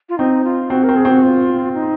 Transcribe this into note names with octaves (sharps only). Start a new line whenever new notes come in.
F4
C4 D#4
F4
C4 F#4
A#4
C4
G#4
C4 F#4
F4
D#4